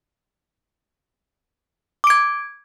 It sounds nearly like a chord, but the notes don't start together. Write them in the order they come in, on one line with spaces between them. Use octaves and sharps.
D6 D7 G#6